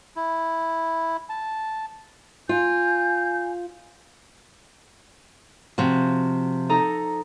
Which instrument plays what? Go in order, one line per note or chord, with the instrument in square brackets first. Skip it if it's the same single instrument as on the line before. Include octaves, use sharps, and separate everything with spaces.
[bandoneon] E4
A5
[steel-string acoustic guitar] F4 [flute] G#5 [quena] G6
[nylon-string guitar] C3 F#4 [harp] F3
[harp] D#4 A4 A#5